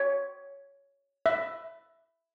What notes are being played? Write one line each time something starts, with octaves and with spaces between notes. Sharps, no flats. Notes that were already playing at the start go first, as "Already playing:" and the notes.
Already playing: C#5
E5